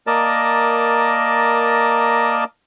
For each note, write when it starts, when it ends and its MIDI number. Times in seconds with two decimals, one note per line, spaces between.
0.07 2.44 58
0.07 2.44 70
0.07 2.44 74
0.07 2.44 75
0.07 2.44 81